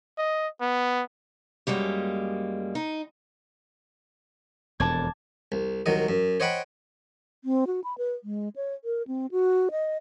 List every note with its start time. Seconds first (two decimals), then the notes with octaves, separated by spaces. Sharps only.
0.18 D#5
0.61 B3
1.67 F#2 G3 G#3 A#3
2.75 D#4
4.80 E1 F2 A5 D6 G#6
5.52 C2
5.86 C2 D#3 F#3 D#5
6.09 F#2
6.40 C5 C#5 D#5 F#5 G5 B5
7.44 C4
7.67 F#4
7.84 B5
7.98 B4
8.24 G#3
8.56 C#5
8.85 A#4
9.07 C4
9.31 F#4
9.71 D#5